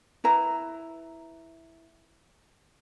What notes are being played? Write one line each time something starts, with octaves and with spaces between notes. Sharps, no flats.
E4 B4 A#5